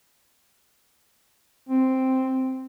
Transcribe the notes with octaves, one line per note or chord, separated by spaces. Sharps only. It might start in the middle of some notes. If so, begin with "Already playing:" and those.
C4